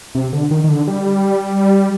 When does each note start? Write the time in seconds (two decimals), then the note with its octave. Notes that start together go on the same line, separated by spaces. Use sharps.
0.15 C3
0.33 D3
0.51 D#3
0.64 D#3
0.69 D3
0.87 G3